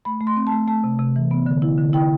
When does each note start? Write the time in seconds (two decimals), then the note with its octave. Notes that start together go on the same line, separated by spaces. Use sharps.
0.05 A3 B5
0.21 A3
0.27 C6
0.36 C4
0.47 A5
0.52 A3
0.68 A3 A5
0.84 C3
0.99 C3
1.16 E3
1.31 B3
1.46 D3
1.62 E4
1.77 D3
1.93 E4 G5